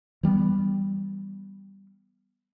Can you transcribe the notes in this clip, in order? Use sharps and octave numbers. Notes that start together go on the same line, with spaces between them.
E3 G3 G#3 B3